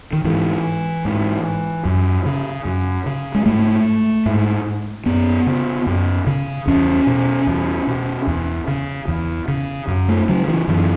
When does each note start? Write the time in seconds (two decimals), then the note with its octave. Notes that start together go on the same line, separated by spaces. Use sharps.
0.13 D#3
0.24 G#2 E3
1.05 G#2
1.85 F#2
2.26 C#3
2.65 F#2
3.06 C#3
3.35 G#3
3.46 G#2 A3
4.26 G#2
5.06 F#2 B3
5.47 C#3
5.86 F#2
6.27 C#3
6.67 E2 C#4
7.07 B2
7.47 E2
7.87 B2
8.27 E2
8.68 C#3
9.08 E2
9.48 C#3
9.88 F#2
10.08 A3
10.28 C#3 F#3
10.48 E3
10.68 F#2 E3